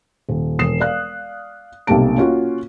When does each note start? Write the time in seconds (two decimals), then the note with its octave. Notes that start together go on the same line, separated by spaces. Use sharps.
0.29 D#1
0.59 E1 D#6 C7 E7
0.80 D5 F5 F#6
1.87 B1 C3 G3 A#3 A5 D7
2.17 A#3 C#4 F4 F#4